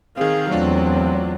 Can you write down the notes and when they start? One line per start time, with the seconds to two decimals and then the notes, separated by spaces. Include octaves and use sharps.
0.17 D#3 C4 G#4 F5
0.51 E2 F#3 A3 C4 D4 F4